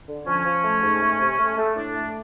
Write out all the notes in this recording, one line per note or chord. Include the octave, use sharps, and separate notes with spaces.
D3
F3 C#4
F3
A3
G#2
A3
C3
A3
A3
A2 D4
A3